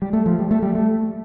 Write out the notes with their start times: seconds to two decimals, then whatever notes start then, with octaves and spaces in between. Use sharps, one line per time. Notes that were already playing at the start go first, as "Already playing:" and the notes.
0.02 G3
0.13 A3
0.26 F3
0.39 G3
0.51 A3
0.62 G3
0.75 A3